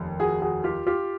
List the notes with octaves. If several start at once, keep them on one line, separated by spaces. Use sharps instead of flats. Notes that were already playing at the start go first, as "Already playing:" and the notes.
Already playing: F1 D#2
F#4 G#4
F#4 G#4
F4 G4
F4 G4